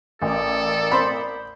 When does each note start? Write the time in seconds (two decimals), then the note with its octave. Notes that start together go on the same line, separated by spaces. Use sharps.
0.22 A1 A4 A#4 D5 G#5
0.91 C5 B5